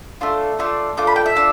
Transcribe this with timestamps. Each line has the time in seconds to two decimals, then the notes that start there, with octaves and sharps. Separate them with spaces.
0.21 A3 D4 F4
0.59 A3 D4 F4
0.97 A3 D4 F4 D6
1.07 B5
1.16 G5
1.26 E5
1.36 D4 F4